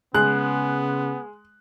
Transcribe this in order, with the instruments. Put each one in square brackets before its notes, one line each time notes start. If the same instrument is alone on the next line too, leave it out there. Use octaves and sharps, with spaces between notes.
[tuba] C#3 [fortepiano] G#3 [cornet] B3 [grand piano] F#6